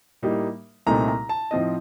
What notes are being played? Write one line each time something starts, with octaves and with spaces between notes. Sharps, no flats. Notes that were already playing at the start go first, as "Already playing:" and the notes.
A2 G3 A#3 D#4
C2 A#2 A3 C4 D#4 A#5
A#5
A5
A2 F3 C4 D#4 D#5